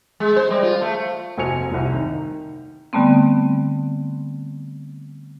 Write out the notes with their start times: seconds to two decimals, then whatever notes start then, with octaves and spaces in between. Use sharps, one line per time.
0.20 G#3
0.36 C5
0.50 G3
0.63 F4
0.82 A3
1.38 F1 C4 F#4 G#5 C#7 F7
1.71 F1 C2
1.93 D#3
2.93 D3 G3 A3 B3 C4